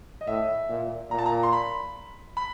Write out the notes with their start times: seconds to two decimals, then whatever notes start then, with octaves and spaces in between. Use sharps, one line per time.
0.21 D#5
0.27 A2 E5
0.69 A#2
1.11 A#2 A#5
1.19 A5
1.26 A#5
1.43 C6
1.53 B5
2.37 B5